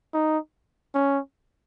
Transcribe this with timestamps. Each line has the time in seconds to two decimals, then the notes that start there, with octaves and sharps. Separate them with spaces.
0.14 D#4
0.95 C#4